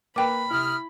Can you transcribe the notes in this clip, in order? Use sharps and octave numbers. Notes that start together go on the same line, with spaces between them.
A#3 B4 G5 B5 D6
C3 E4 D#6 F6